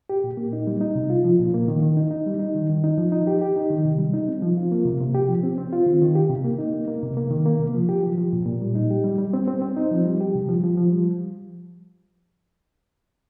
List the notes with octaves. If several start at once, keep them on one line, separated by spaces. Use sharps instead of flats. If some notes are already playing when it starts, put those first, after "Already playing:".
G4
A#2
A#3
D#4
G3
D#4
C3
F4
F3
A#2
A#3
D#3
D#3
D#4
D#4
G3
D#4
D#3
D#3
D#4
F3
D#4
G4
G4
D#4
D#3
C3
G3
D#4
C4
F3
F4
A#3
C3
C3
G4
F3
C4
C4
F4
D#3
D#3
G4
C3
A#3
D#4
A#3
A#3
C3
A#3
D#3
A#3
C3
F3
G4
F3
F3
A#2
A#2
G3
D#4
G4
G3
G3
C4
C4
C4
D#4
F3
G3
G4
C3
F3
F3
F3
G3